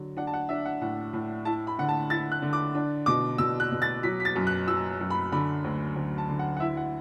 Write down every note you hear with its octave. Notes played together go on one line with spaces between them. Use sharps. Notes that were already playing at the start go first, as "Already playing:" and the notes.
Already playing: D3 F#3
D4 F#5
A5
F#5
D4 E5
F#5
A2 F#5
A2
E4 A5
B5
D3 F#5
A5
E4 A6
F#6
D3
D6
D4
B2 D6
B2 E6
F#6
B2
A6
F#3 B6
B6
A6
F#2
F#6
F#3 E6
F#2
B5
D3 B5
D2
D2
A5
D3
F#5
F#5
E4 E5
F#5